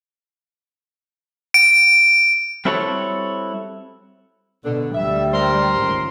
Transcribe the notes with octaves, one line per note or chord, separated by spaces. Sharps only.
D7
G3 C4 E4 F#4 A4 C#5
B2 D3
D2 G3 E5
A#4 C5 C6
G#1 C#2